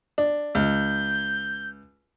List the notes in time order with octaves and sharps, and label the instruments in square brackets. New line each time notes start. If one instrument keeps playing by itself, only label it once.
[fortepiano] D4
[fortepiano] C#2 [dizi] G6